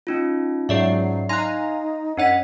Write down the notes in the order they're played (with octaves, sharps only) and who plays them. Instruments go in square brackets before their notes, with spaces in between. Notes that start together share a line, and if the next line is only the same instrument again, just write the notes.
[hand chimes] C#4 D#4 F4
[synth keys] G#2 F#3 C7 [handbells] G#4 D5 E5
[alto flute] D#4 [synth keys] F5 G#5 A#5 [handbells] C6 F#6 [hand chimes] A#6
[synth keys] F#2 F#5 D#7 [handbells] D4 D#5 B6 [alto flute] C#5